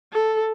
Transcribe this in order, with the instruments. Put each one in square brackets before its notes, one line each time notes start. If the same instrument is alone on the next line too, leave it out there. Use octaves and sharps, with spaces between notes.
[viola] A4